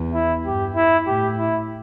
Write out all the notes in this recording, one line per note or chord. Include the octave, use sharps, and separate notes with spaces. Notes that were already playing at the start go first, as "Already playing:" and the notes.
Already playing: E2
E4
G2 G4
E4
A2 G4
E4